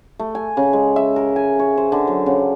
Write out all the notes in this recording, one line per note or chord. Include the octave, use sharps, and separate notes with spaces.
A3
G#5
C#3
G#3
E5
A#4
G#5
C#5
C5
D3
F#3
C#3